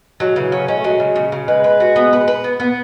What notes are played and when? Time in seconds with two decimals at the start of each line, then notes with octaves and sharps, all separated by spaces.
0.20 F#3 G#3
0.36 C#3 E3
0.52 F#3 C#4
0.68 G#3 C#4
0.77 A3
0.84 F#3 G#3
1.00 C#3
1.16 C#3
1.32 C#3
1.48 G#3 B4
1.64 B4
1.80 F#4
1.96 B3
2.13 B4
2.28 B4
2.44 B3
2.60 B3